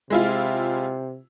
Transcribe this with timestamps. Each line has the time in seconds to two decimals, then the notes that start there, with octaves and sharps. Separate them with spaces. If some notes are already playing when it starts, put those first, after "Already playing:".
0.10 C3 G#3 E4 F4